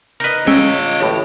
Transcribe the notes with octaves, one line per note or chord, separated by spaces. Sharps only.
D#4 A#4 B4 D#5
G#3 C#4 F4 C#5 G5 E6
A1 A2 G4